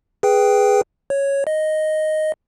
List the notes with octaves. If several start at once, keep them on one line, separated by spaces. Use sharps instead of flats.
G#4 B4 G5
C#5
D#5